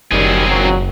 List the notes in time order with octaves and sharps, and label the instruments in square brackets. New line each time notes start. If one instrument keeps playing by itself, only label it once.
[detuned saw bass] F#1 [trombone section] D#3 F#3 G3 [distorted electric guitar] C4 G#4
[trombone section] G#1 A#2 F#3